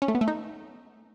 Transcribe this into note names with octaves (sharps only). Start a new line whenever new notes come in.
C#4
A3
B3
A3
D#4